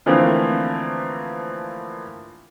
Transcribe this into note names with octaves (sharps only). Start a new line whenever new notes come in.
D3 E3 F3 A3 A#3 C4